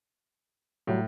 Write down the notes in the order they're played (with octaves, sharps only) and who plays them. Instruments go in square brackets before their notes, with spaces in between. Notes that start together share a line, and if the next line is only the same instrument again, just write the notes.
[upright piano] A2 [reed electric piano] F#3 G3